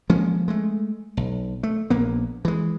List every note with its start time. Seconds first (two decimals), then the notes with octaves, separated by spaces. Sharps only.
0.09 F3 G#3 A#3 C#4
0.48 G#3 A3
1.17 B1
1.63 A3
1.90 A#1 A#3 B3
2.45 E3 G#3